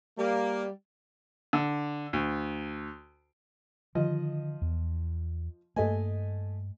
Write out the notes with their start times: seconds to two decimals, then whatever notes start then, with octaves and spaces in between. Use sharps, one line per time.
0.18 G3 A#3
1.53 D3
2.13 D2
3.95 D3 D#3 F3 D#5
4.62 E2
5.76 G2 A3 A#3 D#5 G#5